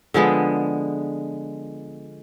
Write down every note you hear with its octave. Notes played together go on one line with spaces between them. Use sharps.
D3 F3 G#3 B3